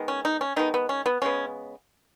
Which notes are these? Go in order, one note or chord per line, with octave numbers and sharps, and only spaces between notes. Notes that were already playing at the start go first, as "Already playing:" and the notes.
Already playing: D#3 G#3 B3
C#4
D#4
C#4
D#3 G#3 B3 D#4
B3
C#4
B3
C#3 G#3 B3 C#4